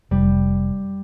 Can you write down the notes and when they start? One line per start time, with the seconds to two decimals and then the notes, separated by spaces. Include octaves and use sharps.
0.11 F1 G3